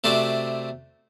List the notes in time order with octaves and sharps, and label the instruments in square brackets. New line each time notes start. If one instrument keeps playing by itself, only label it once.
[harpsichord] C3 A3 F#4 C5 D5